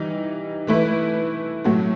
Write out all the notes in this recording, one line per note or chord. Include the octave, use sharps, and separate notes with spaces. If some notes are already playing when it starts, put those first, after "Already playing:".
Already playing: E3 G3 D#4
E3 A3 E4 B4
A2 F#3 A3